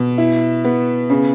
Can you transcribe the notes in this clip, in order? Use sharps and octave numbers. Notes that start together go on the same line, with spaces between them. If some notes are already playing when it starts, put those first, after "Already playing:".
Already playing: B2
E4
B3
C#3